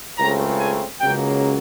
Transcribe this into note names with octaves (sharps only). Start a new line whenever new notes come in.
C#2 C#3 F#3 A3 C4 A#5
G#5
C#2 C#3 F#3 A#3 G5